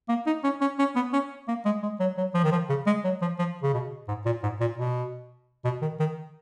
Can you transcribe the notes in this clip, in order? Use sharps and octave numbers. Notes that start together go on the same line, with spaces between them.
A#3
D#4
C#4
C#4
C#4
B3
C#4
A#3
G#3
G#3
F#3
F#3
F3
D#3
F3
C#3
G#3
F#3
F3
F3
C#3
B2
G#2
A#2
G#2
A#2
B2
B2
D#3
D#3